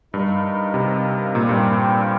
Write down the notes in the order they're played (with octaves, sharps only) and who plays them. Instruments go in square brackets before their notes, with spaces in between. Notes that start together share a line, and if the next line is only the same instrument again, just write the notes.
[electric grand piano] G2 [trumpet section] D#4 A#4 F5
[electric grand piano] C3
[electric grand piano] A#2 [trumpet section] G3 C4 G4 A#4 F5
[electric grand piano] G2